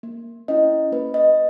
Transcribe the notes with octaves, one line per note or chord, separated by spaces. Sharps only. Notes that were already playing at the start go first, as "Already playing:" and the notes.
A#3
C#4 E4 D#5
A#3 B4
D#5